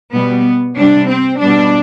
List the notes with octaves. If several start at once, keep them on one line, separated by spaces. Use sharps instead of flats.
B2 G3 B3
C3 G3 D4
C4
B2 G3 D4